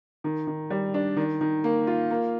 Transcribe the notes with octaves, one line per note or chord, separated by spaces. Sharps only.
D#3
D#3
G3
D4
D#3
D#3
A#3
F4
A#3